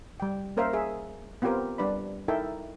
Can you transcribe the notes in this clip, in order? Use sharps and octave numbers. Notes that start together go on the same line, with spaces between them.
G3 G5
A#3 C#4 A#4 C5 E5 F5
G#4 E5
B3 C4 F4 G4 A#4 C5
G3 D4 B4 D5 B5
D#4 E4 A4 A#4 E5 G5